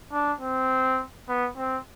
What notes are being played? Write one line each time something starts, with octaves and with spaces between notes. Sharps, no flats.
D4
C4
B3
C4